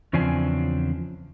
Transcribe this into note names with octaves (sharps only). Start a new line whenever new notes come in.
E2 C#3 F3 C4 D4 G#5